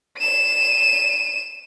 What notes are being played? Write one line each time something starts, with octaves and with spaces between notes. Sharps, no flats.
D#7 E7